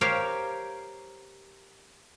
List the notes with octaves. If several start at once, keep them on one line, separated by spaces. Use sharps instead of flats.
G4 A#4 C5 C#5 F5